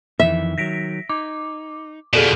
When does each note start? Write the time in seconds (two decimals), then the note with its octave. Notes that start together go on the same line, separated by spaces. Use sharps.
0.20 F2 D#3 E3 E5
0.58 D#3 F#3 A#6 B6 D7
1.09 D#4 D6
2.13 F2 B2 G#4 A4 D5